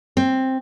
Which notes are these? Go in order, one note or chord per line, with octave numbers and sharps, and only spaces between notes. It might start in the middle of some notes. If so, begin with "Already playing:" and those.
C4